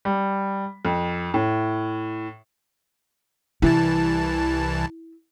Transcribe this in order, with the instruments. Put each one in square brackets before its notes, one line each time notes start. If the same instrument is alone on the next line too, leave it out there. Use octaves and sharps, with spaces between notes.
[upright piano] G3
F2
A2
[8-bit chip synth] C2 E3 A5 [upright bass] E4